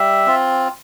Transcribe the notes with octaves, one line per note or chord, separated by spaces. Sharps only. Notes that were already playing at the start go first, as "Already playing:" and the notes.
Already playing: G3 E5
C4 F4